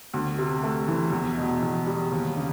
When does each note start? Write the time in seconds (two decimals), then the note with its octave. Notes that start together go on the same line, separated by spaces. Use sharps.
0.14 D2
0.38 C3
0.63 A3
0.88 E3
1.12 E2
1.37 B2
1.63 E2
1.87 G3
2.12 D#2
2.37 C#3